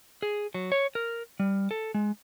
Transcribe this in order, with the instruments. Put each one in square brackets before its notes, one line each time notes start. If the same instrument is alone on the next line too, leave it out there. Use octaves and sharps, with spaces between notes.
[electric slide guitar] G#4
F#3
C#5
A#4
G3
A4
G#3